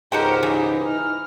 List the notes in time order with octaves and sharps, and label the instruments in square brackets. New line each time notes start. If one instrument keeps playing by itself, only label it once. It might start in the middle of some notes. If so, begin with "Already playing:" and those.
[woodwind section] C#2 G#2 [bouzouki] D#4 F#4 G5 [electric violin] G4 [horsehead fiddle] A#4 C5
[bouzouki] E3 [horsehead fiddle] D#4
[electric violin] F6